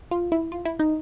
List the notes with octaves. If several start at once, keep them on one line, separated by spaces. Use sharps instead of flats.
F4
E4
F4
E4
D#4